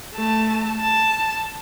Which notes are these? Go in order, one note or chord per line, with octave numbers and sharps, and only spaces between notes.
A3 A5
A5